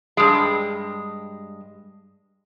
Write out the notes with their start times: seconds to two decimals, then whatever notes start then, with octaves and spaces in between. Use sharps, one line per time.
0.17 G2 G#3